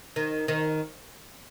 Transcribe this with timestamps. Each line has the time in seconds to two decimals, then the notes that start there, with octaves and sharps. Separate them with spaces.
0.16 D#3
0.48 D#3